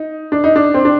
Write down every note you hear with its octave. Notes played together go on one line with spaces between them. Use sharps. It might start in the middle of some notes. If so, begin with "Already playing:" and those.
Already playing: D#4
D4
D#4
D4
C4
D4